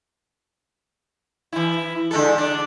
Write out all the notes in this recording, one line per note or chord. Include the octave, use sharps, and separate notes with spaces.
E3 E4
D3 G#3 A4
D4